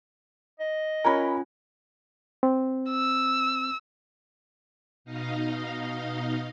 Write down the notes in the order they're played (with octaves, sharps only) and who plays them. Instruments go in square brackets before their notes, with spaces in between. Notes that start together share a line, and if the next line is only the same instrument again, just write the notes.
[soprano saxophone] D#5
[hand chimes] C#4 F4 G#5 [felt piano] A#4 C#5 B5
[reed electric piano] C4
[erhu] E6
[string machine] B2 D#4 D#5 F5